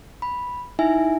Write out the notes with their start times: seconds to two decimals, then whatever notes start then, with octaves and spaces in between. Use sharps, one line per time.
0.22 B5
0.79 D#4 E4 E5 G#5